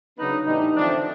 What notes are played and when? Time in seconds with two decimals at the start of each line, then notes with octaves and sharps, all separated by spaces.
0.18 C#3 F#3 B3 D4 D#4
0.46 A2 E3 G3 B3 D4 D#4
0.75 D3 F3 A3 C4 D4